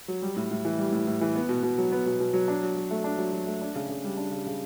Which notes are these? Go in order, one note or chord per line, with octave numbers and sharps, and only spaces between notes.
F#3
G3
A2
A2
E3
G3
A2
A2
E3
B3
B2
B2
F#3
B3
B2
B2
F#3
D4
F#3
F#3
A3
D4
F#3
F#3
A3
D4
C#3
C#3
G3
D4
C#3
C#3